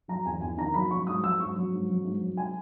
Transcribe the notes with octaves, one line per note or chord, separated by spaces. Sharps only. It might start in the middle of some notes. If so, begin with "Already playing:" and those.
F#3 A#5
E2 G#5
E2 G#5
D#3 A#5
F#3 B5
F#3 C#6
G#2 D#6
F#3 E6
G#2 C#6
F#3
G#2
F#3
G#2
F#3
G#5